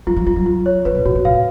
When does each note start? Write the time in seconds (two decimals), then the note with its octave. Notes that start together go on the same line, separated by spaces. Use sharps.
0.07 F#3 F4
0.16 F3
0.27 G3 F4
0.36 F#3
0.46 F4
0.66 C#5
0.85 F3 B4
0.95 B2
1.06 A#2 F#4
1.15 B2
1.25 A2 F5